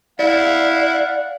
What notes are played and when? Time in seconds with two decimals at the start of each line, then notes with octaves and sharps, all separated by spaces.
0.19 E4 D5 F5 F#5